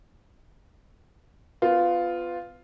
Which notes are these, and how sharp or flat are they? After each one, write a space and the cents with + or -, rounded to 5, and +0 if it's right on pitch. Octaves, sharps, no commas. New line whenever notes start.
B3 +30 F4 +0